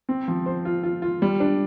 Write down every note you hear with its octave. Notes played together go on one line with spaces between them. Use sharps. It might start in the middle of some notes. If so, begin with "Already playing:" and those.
C4
F3
C5
F4
F4
F4
G3
D4